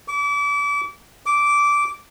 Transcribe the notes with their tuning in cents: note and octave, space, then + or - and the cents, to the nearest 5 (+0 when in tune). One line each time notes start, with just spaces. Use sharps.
D6 -35
D6 -10